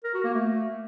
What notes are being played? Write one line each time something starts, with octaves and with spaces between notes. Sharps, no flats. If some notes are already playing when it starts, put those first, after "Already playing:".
A#4
F#4
A#3
A3